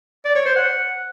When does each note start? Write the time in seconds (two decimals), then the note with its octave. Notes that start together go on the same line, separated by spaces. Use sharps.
0.25 D5
0.35 C#5
0.46 C5
0.56 F#5